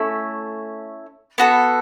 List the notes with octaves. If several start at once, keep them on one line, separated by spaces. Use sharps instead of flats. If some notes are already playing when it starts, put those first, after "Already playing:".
Already playing: A3 C#4 E4
B3 F#4 A4